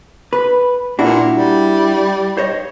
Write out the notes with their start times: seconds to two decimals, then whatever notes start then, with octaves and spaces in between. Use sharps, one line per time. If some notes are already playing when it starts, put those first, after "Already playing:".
0.33 B4
0.99 A#2 D4 E4 F#4
1.32 G3
2.37 C5 C#5 D#5